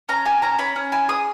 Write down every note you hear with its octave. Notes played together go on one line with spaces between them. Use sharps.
C#4 A#5
G4 G#5
C#4 A#5
C#4 B5
C#4
E4 G#5
G#4 D#6